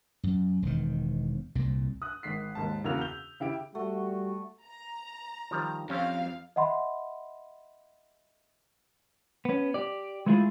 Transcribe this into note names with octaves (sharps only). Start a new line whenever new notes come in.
F#2
E1 D#3
C2 A#2
D#6 F#6
G#1 B6 C7
D#2 G#2 A5
E2 C#3 A#3 F#4 E6 F7
G6 F7 G7
C#3 E4 G4 D7
G3 A3 F#4
A#5
D#3 F3 G3
F2 C4 C#4 G4 F5
D#5 E5 F#5 B5 C6
B3 C#4
G4 D5
G#3 A3 B3 E4 F4 G#4